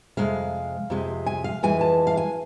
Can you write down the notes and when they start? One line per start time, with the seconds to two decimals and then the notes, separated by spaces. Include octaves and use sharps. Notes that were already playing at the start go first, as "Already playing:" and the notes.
0.17 F2 C3 G#3 F5
0.90 F2 C3 G#3
1.26 G#5
1.44 F5
1.63 F2 E3 G#3 G#5
1.81 A5
2.07 F5
2.17 G#5